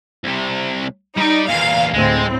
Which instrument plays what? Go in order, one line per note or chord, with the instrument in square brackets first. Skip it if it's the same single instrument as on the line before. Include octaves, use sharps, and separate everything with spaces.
[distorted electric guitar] C2 C3
[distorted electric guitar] G3 D5 [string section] D#4
[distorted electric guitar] E2 A#2 [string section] F5
[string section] D2 A2 C4 [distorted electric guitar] G#3